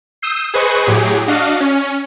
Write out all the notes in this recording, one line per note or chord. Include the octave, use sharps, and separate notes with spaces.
D#6 E6 G6 C7
G#4 B4 C5 D#5 C#6
A2 F#3 G4 G#4
D4 F#4 D#5 F5
C#4